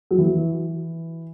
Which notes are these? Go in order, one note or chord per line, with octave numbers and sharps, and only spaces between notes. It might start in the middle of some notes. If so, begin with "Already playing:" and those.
F#3
E3